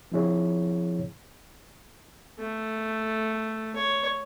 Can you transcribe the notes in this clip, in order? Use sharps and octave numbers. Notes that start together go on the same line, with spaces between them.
F3 C4 D#4 E4 G#4 C#5
A3
C#5